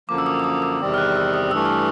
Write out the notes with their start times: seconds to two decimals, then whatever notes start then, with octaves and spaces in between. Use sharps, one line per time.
0.09 F#2 D3 F3 A#3 D6
0.18 E6
0.26 D#6
0.40 E6
0.44 D#6
0.62 E6
0.81 E2 C3 D#3 G3 C4
0.94 F6
0.98 F#6
1.16 E6
1.34 D#6
1.51 G2 E3 A3 E6
1.65 F6